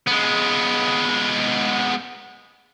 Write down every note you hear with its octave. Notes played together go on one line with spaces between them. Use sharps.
G#3 B3